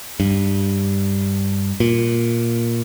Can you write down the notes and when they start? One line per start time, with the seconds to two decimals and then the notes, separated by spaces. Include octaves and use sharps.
0.20 G2
1.80 A#2